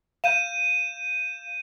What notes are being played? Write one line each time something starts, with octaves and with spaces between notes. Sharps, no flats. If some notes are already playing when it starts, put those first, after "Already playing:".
F5 G6 D#7 E7